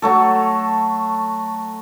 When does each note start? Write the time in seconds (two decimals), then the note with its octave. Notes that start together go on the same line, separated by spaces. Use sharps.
0.02 F#3 A3 A4